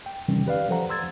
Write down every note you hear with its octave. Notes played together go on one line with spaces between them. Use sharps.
G5
C3 D#3 E3 G3 C#4
G4 B4 D5 F5
F3 A4 C5 F#5 A#5
C6 E6 G#6 A6